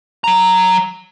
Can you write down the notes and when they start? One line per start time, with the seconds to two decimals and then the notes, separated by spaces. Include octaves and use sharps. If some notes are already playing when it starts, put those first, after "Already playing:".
0.24 F#3 A#5